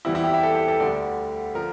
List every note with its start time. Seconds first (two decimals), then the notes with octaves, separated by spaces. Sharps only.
0.05 E2 E3 G3 C4 E4
0.15 E4
0.24 G4
0.34 E5
0.43 A4
0.55 G4
0.68 A4
0.80 D2 D3 G3 D5
1.54 D3 F3 A#4